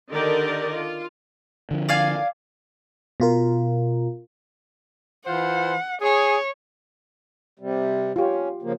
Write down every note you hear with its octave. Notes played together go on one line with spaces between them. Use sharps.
D3 D#3 G4 A#4 D5 D#5
F4
D3 F3
D5 F5 G#5
B2 F4 A#4
E3 F4 C5 F#5
G#4 C#5
C3 G3
C#4 F4 G4
C#3 F3 A#3